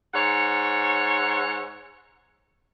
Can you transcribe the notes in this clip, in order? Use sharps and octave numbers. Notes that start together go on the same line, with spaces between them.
G#2 C#5 F#5